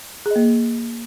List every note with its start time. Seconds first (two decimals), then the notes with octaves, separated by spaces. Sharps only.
0.26 G#4
0.31 D#5
0.36 A#3